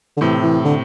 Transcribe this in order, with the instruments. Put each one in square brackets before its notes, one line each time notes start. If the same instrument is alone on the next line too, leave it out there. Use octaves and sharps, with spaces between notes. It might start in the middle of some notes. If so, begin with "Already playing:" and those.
[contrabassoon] D3
[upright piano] A2 C3 [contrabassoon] E3
[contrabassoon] E3
D3